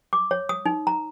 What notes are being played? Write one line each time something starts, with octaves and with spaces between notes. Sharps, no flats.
D6
C#5
D#6
D#4
A#5